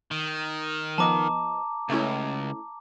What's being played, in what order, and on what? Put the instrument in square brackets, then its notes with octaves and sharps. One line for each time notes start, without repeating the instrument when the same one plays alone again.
[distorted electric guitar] D#3
[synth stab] F3 B3 D#5 [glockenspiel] A5 A#5 D6
[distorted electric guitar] C#2 [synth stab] A3 C#4 E4